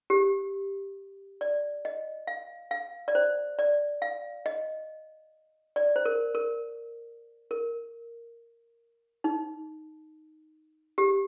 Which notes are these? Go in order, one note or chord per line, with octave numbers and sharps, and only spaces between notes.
G4
D5
D#5
F5
F5
D5
C5
D5
F5
D#5
D5
C5
A#4
A#4
A#4
D#4
G4